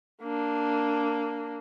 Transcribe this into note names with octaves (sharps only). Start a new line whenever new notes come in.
A#3 D4